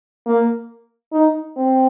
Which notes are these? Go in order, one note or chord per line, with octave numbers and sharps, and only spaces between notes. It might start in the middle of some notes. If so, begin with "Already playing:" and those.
A#3
D#4
C4